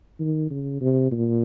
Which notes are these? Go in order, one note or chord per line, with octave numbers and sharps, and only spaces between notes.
D#3
C#3
C3
A#2